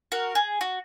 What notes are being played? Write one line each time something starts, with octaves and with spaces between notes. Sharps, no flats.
F#4 A#4
G#4
F#4